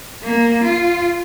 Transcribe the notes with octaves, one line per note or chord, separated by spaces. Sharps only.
A#3
F4